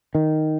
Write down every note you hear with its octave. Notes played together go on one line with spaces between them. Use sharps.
D#3